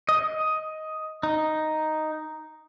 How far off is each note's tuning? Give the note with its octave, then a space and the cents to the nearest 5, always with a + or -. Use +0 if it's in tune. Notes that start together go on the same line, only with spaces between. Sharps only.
D#5 +10
D#4 +0